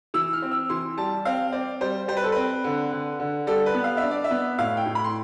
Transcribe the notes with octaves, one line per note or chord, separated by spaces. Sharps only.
E3 E6
F6
C4
E6
E3 C6
G3 A5
C4 F5
C4 D5
G3 C5
G3 C5
B4
A4
C4 B4
D3
D3
D3
G3 A4
B4
B3
F5
D4 E5
D5
E5
B3
A2 F5
G5
A2
B5
C6